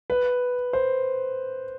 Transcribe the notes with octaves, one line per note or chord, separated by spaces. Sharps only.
B4
C5